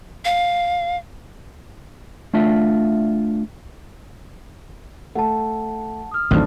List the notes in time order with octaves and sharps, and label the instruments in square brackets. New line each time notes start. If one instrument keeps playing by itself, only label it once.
[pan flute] F5
[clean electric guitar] A3 D4 F4 E5
[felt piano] A3 [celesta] F#5 A5
[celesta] D#6 F6
[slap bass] A1 D#2 [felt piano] A2 C4 D4 [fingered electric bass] D#3 F#3